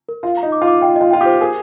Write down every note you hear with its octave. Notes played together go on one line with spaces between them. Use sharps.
A#4
F4 F5
A#5
D#4
D6
F4
D6
F4 G5
F4 D#5
F4 G5
G4
C5
G#4 A#4